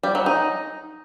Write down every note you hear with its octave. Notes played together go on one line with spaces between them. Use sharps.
G3
F#3
D#4